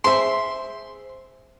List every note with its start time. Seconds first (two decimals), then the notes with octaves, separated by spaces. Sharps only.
0.04 G#4 C5 E5 C6